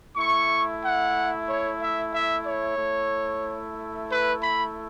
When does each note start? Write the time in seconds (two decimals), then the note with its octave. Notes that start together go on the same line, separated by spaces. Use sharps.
0.16 A3 E4 C#6
0.82 F#5
1.47 C#5
1.80 E5
2.12 E5
2.45 C#5
2.76 A3 E4
4.07 B4
4.39 B5